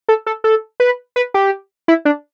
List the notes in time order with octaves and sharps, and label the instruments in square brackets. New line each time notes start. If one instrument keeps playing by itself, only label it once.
[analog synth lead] A4
A4
A4
B4
B4
G4
E4
D4